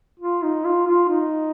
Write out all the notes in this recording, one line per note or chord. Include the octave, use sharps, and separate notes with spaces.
F4
D#4
F4
F4
D#4